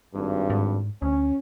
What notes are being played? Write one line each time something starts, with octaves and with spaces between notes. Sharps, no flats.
G#1 G2
G#2
D2 C#4